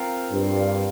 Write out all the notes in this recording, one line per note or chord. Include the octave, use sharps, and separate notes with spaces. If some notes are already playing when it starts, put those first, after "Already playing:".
Already playing: C4 F4 A#4
G2